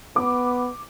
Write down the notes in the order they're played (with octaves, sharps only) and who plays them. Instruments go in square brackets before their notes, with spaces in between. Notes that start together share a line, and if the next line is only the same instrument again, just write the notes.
[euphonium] B3 [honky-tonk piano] D6